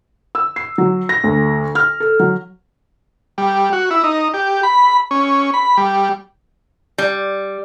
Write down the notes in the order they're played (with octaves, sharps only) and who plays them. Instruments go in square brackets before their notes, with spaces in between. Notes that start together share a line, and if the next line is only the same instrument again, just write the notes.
[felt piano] E6
C7
F#3
A#6
D2
F6
A4
F#3
[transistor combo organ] G3
F#4
E4
D#4
G4
B5
C#4
B5
G3
[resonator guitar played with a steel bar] G3